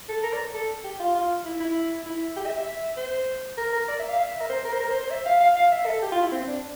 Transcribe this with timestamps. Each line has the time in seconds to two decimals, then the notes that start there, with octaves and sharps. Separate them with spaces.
0.09 A4
0.24 A#4
0.33 D5
0.54 A4
0.84 G4
1.00 F4
1.15 F4
1.45 E4
1.60 E4
2.06 E4
2.37 G4
2.46 E5
2.57 E5
2.97 C5
3.58 A#4
3.73 A#4
3.88 D5
4.00 E5
4.09 F5
4.19 E5
4.41 A#4
4.50 C5
4.65 A#4
4.73 C5
4.80 A#4
4.90 C5
5.01 C5
5.10 E5
5.26 F5
5.41 F5
5.56 F5
5.72 E5
5.86 A4
6.02 G4
6.12 F4
6.23 E4
6.32 C4
6.48 D4